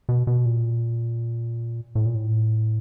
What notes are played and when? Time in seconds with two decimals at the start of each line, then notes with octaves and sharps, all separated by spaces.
0.09 B2
0.27 B2
0.46 A#2
1.95 A2
2.06 A#2
2.15 A2